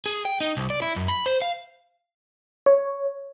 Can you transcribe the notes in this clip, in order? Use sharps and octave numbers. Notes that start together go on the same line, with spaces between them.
G#4
G5
D#4
C2
D5
E4
F#2
B5
C5
F5
C#5